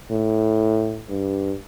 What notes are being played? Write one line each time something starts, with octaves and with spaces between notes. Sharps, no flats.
A2
G2